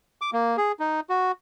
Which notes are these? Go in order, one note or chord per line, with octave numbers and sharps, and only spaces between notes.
D6
A#3
G#4
D#4
F#4